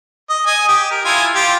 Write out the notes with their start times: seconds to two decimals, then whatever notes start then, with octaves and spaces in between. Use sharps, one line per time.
0.30 D#5
0.46 D#5 G#5
0.68 G4 D#5
0.91 A#4
1.05 E4 F4 G#5
1.35 F4 G4